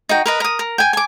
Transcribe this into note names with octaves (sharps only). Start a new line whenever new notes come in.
D#4 F#4 G5
A#4 B4 D#5
A#4 D#6
A#4
G5 G#5
G#5 D6